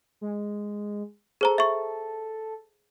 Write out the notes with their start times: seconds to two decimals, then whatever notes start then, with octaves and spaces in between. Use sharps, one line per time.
0.21 G#3
1.41 G#4 A4 C5 A#5
1.58 E5 C#6